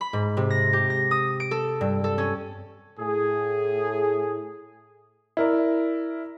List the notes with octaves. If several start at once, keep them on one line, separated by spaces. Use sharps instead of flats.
B5
G#2
C3
A#6
G4
A#6
D#6
D7
A4
G2
A4
C#4
A2 G#4
E4 A#4 D5